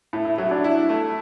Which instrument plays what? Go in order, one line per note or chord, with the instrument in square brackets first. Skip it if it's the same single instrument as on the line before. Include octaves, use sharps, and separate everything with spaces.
[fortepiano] A2 [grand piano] E4
[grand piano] E4
[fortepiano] F#3 [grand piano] E4
[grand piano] D4
[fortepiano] E4
A3